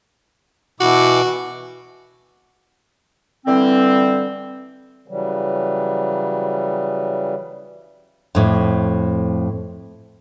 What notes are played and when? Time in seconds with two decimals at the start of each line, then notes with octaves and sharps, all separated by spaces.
0.80 B2 E3 F#4 D6
3.46 D3 E3 G3 C4
5.08 C#3 E3 F#3 G3
8.35 F2 A2